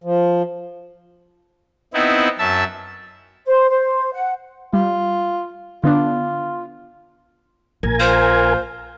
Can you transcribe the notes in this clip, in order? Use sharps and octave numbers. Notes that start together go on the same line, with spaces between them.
F3
B3 C4 D#4 E4
F#2 E5 A5 E6
C5
C5
F#5
G3 F4
D3 B3 D4 F4
A#1 A#4 G#5
F4 C5